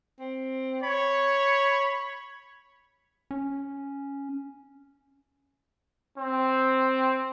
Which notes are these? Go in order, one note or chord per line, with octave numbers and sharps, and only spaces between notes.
C4
C#5 B5
C#4
C4